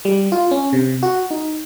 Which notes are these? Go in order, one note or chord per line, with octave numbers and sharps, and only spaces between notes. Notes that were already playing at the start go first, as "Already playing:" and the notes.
G3
F4
C#4
C3
F#4
D#4